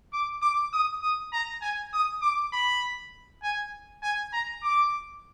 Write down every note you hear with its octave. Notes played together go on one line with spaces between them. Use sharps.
D6
D6
D#6
D#6
A#5
G#5
D#6
D6
B5
G#5
G#5
A#5
D6